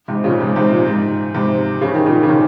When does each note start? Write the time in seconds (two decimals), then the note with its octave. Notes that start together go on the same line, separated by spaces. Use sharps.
0.08 G#2 C3
0.24 A#2 C#3
0.40 G#2 C3
0.56 G#2 C3
0.71 A#2
0.87 G#2
1.35 G#2 C3
1.81 C#3
1.94 D#3
2.06 A#2 C#3
2.23 C#3
2.28 C3 D#3